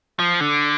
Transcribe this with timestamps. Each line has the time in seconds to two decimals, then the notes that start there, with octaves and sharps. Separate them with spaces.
0.19 F3
0.41 D3